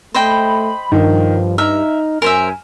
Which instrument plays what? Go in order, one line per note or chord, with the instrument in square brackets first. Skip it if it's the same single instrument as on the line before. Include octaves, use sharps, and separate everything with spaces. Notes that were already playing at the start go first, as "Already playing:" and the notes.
[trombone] A3 [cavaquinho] C5 D#5 G5 [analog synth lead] B5
[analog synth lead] G2 [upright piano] D#3 [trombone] F3
[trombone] D#4 [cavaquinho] E5 [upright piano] A#5 F6
[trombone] F#2 [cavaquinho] A#4 C5 E5 [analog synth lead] G#5